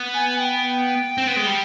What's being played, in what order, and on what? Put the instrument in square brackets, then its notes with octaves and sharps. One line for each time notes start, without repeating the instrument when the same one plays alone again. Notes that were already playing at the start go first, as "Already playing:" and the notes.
Already playing: [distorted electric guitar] B3
[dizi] G#5
G#5
G5
[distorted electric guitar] C4
B3
G#3
G3